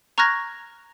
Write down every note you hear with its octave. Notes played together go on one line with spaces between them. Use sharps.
A#5 C#6 F6 F#6 G#6 A#6